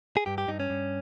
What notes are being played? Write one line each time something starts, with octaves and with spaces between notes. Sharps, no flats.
G#4
G2 G4
G4
G2 D#4
C#4
G2